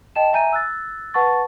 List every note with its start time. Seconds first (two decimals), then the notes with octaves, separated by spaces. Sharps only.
0.15 D#5 G5 A5 E7
0.33 E5 G#5 A#5 G6 D#7
0.53 E6 F#6 A6
1.14 B4 F#5 A5 C#6 A6